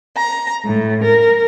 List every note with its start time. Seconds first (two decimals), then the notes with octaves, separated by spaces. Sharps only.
0.15 A#5
0.65 A2
1.04 A#4